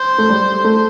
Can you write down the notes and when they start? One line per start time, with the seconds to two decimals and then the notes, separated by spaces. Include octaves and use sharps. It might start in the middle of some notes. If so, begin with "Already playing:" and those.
Already playing: C5
0.18 A3
0.29 G3
0.65 A3